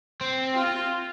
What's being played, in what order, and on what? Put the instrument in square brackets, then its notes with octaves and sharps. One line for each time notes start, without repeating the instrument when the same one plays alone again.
[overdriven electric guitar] C4
[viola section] F4